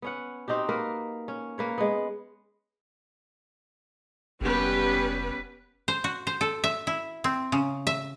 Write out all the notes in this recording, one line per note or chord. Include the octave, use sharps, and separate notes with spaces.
B3 C#4 F#5
C4 D#4 F#4 G4
A#3 A#4 B4
C#4
A#3 B4 C#5
G#3 B3
F1 G3 B3 C#4 G4 B4
C5
F#4
C5
A4
E5
E4
C4
C#3
E5